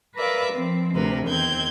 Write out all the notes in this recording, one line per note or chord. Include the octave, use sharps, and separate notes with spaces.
A#4 B4 D5 E5 F5
F3 C4
D2 C3 A#4 B4
E2 D#3 C4 G6 G#6